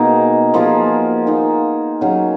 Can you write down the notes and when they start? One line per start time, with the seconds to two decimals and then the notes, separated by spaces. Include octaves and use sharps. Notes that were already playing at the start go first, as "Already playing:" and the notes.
Already playing: B2 A#3 D#4 G#4
0.54 F3 A#3 F4 G#4
1.27 D#3 A#3 D#4
2.01 D#3 F#3 C#4 G#4